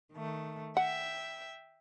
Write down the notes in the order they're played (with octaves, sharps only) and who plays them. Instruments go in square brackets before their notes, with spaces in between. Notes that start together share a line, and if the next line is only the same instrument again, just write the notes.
[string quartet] D#3 A3
[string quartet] E5 G5 [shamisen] F#5